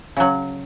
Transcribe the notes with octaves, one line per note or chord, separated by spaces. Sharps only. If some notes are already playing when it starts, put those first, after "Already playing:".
C#3 F#3